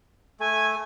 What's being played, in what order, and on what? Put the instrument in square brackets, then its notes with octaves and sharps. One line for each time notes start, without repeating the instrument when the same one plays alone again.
[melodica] A3 [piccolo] G#5